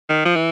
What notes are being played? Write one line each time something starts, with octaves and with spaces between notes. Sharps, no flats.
D#3
F3
E3